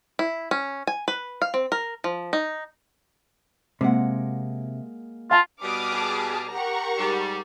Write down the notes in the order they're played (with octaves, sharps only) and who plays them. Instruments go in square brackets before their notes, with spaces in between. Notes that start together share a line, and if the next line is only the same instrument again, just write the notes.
[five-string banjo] E4
C#4
G#5
B4
F5
C4
A#4
F3
D#4
[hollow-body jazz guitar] C3 [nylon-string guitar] G#3 A#3 F#5
[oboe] F4 [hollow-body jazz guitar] F5 A5
[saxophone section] B2 G3 [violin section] D6 D#6 F6
[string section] G#4 A5
[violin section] G4 A#4 F#5 [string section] A#5 C#6
[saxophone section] G#2 G3